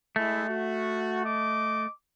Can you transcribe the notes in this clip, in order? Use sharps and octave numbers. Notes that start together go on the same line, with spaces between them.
G#3 A3 E4
F#4
D#5 D6